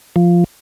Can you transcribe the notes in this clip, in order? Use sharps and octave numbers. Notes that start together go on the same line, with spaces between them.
F3